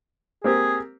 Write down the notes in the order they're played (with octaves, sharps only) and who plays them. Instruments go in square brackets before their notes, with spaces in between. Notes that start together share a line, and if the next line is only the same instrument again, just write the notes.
[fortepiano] A#3 C4 G4 [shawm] G#4